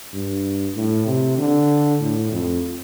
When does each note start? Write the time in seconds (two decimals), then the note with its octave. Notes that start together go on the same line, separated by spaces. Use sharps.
0.14 G2
0.76 A2
1.07 C3
1.38 D3
2.01 A2
2.32 F2